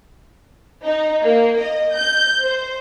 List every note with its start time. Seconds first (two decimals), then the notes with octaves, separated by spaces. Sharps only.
0.84 D#4
1.23 A#3
1.58 D#5
1.94 G6
2.43 C5